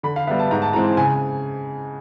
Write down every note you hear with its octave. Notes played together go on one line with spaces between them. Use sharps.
D3 B5
F5
G3 B3 E5
A5
G#2 A#5
A5
E3 G#3 C4 A#5
C#3 G#5